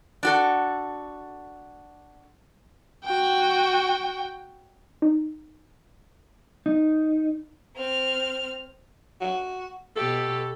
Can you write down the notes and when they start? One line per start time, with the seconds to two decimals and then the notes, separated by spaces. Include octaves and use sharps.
0.23 D4 F#4 A4
3.05 F#4 G5
5.02 D#4
6.66 D#4
7.76 C4 F6
9.21 F#4
9.96 B2 G4 A4